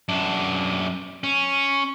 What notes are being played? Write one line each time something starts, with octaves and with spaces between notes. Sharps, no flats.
F#2 D4
C#4